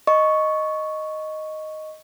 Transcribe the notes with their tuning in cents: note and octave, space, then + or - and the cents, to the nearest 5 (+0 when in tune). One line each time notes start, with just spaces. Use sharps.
D#5 +0 C#6 +0